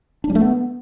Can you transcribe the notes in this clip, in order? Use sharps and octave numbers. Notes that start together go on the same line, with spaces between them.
D4
G3
A3
B3